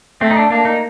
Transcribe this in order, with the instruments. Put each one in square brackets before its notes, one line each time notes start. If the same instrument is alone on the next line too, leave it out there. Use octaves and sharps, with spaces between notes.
[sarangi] A3 [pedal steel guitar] C4
[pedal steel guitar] D#4
D4
[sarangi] A#3 [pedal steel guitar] D4
[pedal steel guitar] D#4